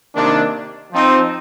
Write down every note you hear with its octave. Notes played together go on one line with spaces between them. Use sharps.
C3 D#3 A#3 D4
F3 C4 D#4